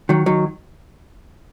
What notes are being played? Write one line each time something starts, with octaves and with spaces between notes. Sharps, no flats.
D#3 F#3
D#3 F#3